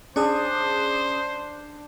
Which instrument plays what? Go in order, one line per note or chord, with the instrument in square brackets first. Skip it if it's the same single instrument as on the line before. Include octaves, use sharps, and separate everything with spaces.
[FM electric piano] C#4 G#4 D#6 [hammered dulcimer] D4 [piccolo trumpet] C5